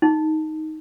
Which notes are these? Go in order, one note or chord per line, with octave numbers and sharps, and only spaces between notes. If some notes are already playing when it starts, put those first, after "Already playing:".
D#4